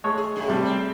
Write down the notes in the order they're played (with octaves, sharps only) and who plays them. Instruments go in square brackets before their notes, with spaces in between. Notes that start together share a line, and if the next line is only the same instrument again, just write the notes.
[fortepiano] G#3 A3 C#5
[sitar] G#4
F#2 G#4
[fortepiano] C3 G3 A3
[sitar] C4